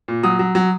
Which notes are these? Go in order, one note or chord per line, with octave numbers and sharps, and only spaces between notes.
A#2
F#3 D#6
F#3
F#3